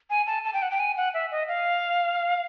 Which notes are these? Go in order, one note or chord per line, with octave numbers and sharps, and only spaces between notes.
G#5
A5
A5
G5
F#5
G5
G#5
F#5
E5
D#5
F5